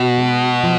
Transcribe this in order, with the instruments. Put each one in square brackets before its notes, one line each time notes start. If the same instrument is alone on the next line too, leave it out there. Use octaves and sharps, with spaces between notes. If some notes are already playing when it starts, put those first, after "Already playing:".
Already playing: [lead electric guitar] B2 [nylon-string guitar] F#4
[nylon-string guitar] G#3
F3